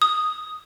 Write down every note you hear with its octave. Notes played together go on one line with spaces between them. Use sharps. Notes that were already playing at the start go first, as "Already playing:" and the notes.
D#6